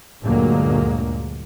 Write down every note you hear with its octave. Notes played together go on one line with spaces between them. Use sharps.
D2 G2 A#2 F#3 G#3 A#3